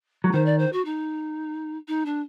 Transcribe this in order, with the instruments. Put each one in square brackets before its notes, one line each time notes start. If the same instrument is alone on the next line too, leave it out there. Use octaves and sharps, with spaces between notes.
[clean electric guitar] F#3
[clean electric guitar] D#3 [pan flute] C5
[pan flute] D5
C5
F#4
D#4
D#4
D4